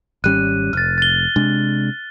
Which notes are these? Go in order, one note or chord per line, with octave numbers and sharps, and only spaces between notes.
G#1 G3 C#4 F#6 D#7
F1 F6 A6
A6 G7
C3 G#3 D4